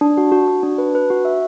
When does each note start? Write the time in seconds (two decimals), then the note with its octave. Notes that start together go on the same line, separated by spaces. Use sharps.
0.01 D4
0.17 F#4
0.32 F#4
0.48 F#4
0.63 D4
0.78 B4
0.95 B4
1.10 F#4
1.25 E5